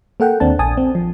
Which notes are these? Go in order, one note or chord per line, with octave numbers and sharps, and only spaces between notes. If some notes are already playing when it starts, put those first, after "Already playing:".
A#3 A4 F#5 G5
D#2 C4 D4 A5
A#1 G#5 A5 D#6
C4
F3